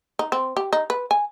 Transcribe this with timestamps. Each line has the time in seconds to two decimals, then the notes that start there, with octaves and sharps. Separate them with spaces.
0.19 D#4
0.32 C4
0.57 G4
0.73 D#4
0.90 B4
1.11 G#5